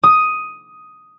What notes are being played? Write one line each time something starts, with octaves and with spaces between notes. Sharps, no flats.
D#6